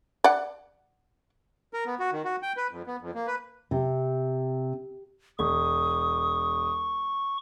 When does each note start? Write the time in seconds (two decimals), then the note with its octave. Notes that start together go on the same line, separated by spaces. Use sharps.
0.24 D5 F#5
1.73 A#4
1.86 B3
2.00 F#4
2.12 D#3
2.25 F#4
2.43 G5
2.57 B4
2.71 F2
2.87 B3
3.01 F2
3.14 A#3
3.27 B4
3.71 C3
5.39 E1 C#6 D#6